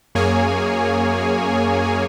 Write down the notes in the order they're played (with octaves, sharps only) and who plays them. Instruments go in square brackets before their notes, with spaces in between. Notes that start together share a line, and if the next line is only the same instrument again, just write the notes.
[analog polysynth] F#2 A#3 G#4 C#5 G#5